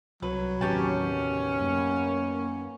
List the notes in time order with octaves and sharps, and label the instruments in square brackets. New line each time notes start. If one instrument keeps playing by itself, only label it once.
[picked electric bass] C2 [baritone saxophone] F#3 [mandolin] B4
[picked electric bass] A1 D#2 C3 [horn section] D#3 B3 C#4 [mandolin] G4 A5
[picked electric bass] F#2 [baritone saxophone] A#3